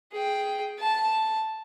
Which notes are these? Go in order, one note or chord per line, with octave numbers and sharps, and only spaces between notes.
G#4 G5
A5